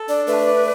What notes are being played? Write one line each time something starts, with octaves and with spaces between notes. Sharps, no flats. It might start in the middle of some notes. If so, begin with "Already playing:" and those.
Already playing: A4
D4 D5
A3 B4
D5